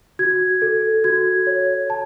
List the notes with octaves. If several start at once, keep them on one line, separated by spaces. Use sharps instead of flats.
F#4 G#6
A4
F#4 G#6
C#5
A5